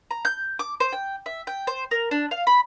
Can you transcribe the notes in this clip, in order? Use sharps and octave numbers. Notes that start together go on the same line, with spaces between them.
A#5
G6
D6
C5
G5
E5
G5
C5
A#4
D4
F5
B5